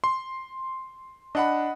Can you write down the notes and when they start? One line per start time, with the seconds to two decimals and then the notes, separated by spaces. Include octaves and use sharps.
0.04 C6
1.35 D4 D#5 F#5 B5